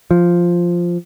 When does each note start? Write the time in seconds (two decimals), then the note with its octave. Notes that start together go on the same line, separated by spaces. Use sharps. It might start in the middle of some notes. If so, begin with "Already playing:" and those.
0.11 F3